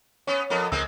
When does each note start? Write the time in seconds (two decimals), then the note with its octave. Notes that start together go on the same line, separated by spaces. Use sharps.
0.27 B3 C#4 C#5
0.50 F2 B3 A#4
0.72 C#2 G#3 A#3 C4 E6